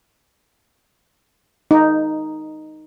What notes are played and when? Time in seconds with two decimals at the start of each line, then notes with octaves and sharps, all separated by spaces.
1.71 D#4